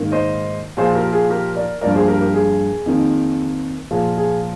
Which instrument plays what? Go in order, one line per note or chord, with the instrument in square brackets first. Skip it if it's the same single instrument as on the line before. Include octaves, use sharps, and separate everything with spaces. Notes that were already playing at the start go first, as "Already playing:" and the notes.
Already playing: [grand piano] G#2 D#3 A#3
C5 D#5
A#2 F3 A#3 G#4 C5
G4 A#4
G#4
G4 A#4
A#4 D5
G2 F3 A#3 A#4 D5
G#4 C5
G4 A#4
G4 A#4
G#4
F2 D#3 A#3
A#2 F3 A#3 G#4
G#4